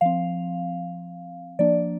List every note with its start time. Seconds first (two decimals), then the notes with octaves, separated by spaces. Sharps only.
0.01 F3 C4 F5
1.59 F3 A#3 D4 D5